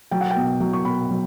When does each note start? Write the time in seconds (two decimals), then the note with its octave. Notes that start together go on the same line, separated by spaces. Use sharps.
0.11 F#3 G5
0.21 F#5
0.30 G5
0.36 B2
0.60 F#3
0.73 C#6
0.85 B2 B5
1.11 F#3